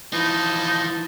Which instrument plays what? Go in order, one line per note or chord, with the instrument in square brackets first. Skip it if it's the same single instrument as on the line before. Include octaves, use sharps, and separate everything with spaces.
[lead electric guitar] E3 F3 [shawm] D#4 [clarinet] E4 [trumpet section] A5